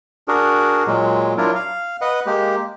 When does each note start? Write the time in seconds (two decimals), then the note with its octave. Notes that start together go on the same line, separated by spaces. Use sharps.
0.28 D4 F#4 G#4 A#4
0.87 A#2 F#3 G#3
1.38 F#3 D4 E4 F4 A#4
1.55 F5
2.01 B4 D#5 F#5
2.26 G#3 A#3 G4